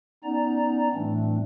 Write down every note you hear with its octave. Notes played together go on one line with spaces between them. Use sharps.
B3 C#4 D#4 D5 A#5
A2 E3 G3 A3 C4 D4